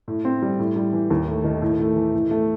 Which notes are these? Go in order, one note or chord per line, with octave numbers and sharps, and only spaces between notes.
A2
C4
G3
A2
G3
E3
D#2
A3
D#3
A2
A3
E3
A2
A3